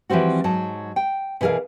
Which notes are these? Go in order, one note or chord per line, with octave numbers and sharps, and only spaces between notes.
E3 F3 G3 C4 F#4
G#2 F#3 A5
G5
B2 E3 G#4 A#4 F5